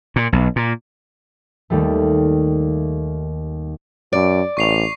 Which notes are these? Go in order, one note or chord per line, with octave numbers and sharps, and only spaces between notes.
A#2
B1
A#2
D#2 G3 A3
F#2 D5
A1 C#6 C7 F7